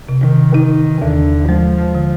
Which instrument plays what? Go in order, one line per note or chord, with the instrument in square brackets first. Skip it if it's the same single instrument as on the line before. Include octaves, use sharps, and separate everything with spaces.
[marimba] C3
[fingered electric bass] D#3
[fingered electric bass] D#3 [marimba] D#4
[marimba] D#2 [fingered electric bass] D3
[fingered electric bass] F3 [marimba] G#3
[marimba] D3